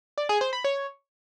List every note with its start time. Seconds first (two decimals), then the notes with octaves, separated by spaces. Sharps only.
0.18 D5
0.29 G#4
0.41 C5
0.53 B5
0.64 C#5